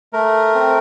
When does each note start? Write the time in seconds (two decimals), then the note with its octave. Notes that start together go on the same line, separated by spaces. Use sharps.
0.13 A3 A#4
0.55 C4